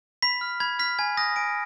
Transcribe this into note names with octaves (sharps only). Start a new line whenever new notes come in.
B5 B6
F6
B5 G#6
F6 B6
G#5 G#6
D#6 F#6 A#6
G#5 D7